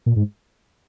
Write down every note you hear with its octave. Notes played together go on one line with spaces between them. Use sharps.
A#2
G#2